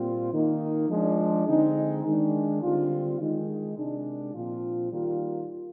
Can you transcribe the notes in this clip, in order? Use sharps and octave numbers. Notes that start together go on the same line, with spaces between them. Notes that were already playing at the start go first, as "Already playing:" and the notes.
Already playing: A#2 G3 C4 F4
D#3 A#3 D#4
F3 G#3 D4
D3 G#3 C4 D#4
D#3 G#3 D4
D3 G3 C4 F4
D#3 G#3 D#4
C3 D#3 G#3 D4
A#2 F3 C4 F4
D#3 G3 A#3 F4